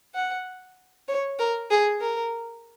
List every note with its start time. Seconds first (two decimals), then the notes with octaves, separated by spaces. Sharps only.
0.15 F#5
1.08 C#5
1.39 A#4
1.70 G#4
2.01 A#4